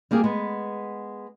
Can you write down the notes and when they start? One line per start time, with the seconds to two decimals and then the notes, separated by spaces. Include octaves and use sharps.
0.11 G3 A#3 G4 G#4
0.24 G#3 B3